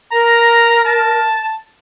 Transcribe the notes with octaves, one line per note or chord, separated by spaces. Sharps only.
A#4 A#5
A5